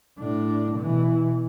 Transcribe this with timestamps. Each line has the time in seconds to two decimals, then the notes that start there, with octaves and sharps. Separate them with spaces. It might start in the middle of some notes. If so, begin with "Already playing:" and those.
0.19 A2 D4
0.78 B2 E3